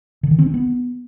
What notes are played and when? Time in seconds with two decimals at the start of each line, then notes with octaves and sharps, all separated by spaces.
0.23 D3
0.31 D#3
0.39 C4
0.46 D4
0.54 B3